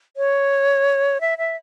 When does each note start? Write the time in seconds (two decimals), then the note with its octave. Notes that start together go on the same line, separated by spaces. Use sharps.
0.17 C#5
1.21 E5
1.38 E5